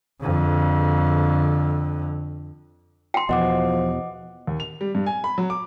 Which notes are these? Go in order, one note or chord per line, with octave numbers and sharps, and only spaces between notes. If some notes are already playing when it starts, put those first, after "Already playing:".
F2 D3
G5 C6 C7
E2 B2 F3 D#5 F#5 D6
D#2
F7
G3
G2
G#5
B5
F#3
D6